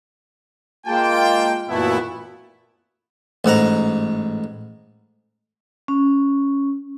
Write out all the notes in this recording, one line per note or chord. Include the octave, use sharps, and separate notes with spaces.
G#3 A#3 F4 G5 A5
F#2 A#2 E3 A3 B3 E4
A1 G#2 F#5 A#5
C#4